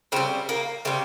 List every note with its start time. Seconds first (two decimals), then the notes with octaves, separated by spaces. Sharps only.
0.12 C#3 G3 C4
0.49 A#3
0.85 C#3 G3 C4